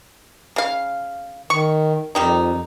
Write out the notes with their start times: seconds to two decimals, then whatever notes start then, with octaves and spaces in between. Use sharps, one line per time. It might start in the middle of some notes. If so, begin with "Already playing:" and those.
0.56 C#3 F5
1.50 D#3 C#6
2.15 F2 D#3 G3 D#4